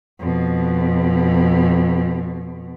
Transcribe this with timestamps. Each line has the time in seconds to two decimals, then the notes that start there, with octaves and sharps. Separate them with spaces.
0.19 F2 B2